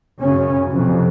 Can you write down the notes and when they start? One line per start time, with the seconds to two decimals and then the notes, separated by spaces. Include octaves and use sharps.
0.20 F#2 C#3 C#4
0.72 F2 C3